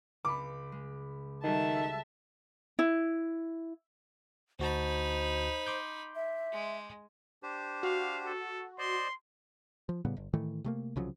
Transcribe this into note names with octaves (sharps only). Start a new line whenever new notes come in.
C#2 B5 D6 C#7
G#3
D#3 G3 F#4 A4 E5 A5
E4
D2 D#4 F#4 C5 A5 B5
C6 D6 G6
E5
G#3
D4 G4 C5
F#4 F5
A4
C5 D5 D#5 C6
F3
A2 C#3 G3 B3
G1
A2 D#3 E3 A3
C3 A3 A#3
C2 C#3 F3 F#3